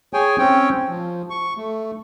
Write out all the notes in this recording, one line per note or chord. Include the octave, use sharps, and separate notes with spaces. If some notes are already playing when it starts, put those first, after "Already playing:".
G#4 C#5 G5 G#5
C4 C#4 C#5 G5
F3
C#6
A3